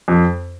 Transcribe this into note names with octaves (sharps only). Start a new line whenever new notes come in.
F2